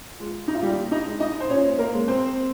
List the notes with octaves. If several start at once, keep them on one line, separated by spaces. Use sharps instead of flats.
F3 G#3
D#4
F4
A#2 G3 G4
D#4 D#5
G#3
D#4 D#5
C5
A#2 C#4 C#5
A#3 A#4
G#3
C4 C5